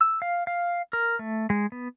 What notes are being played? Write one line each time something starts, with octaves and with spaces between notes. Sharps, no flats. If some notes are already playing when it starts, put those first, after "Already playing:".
E6
F5
F5
A#4
A3
G#3
B3